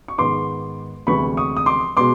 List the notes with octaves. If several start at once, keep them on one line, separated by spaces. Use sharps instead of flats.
C#6
G#2 D#3 G#3 B3 C6 D6
D2 C3 E3 G#3 B3 B5 C#6
C#6 D#6
D#6
C6 D6
B2 G#3 B3 C6 D6